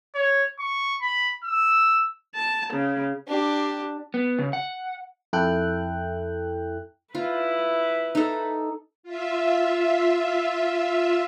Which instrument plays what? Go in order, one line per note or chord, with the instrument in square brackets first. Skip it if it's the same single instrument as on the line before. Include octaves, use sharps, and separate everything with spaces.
[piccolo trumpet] C#5
C#6
B5
E6
[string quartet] A5
C#3
[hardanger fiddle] D4 G4
[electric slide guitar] B3
C#3
F#5
[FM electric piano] F2 E4 A4 G5 F#6
[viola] E4 B4 [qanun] F4
[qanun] D#4 A4
[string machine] F4 E5